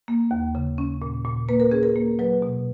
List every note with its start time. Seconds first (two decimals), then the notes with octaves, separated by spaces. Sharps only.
0.08 A#3
0.31 D#2
0.55 C#3
0.78 C#4
1.02 A#2
1.25 A#2
1.49 A#3 B4
1.60 A#4
1.71 C#4 G#4
1.83 A#4
1.96 A#3
2.19 F#3 B4
2.42 B2